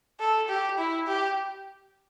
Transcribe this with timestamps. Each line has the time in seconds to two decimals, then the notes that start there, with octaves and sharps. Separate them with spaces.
0.20 A4
0.49 G4
0.78 E4
1.07 G4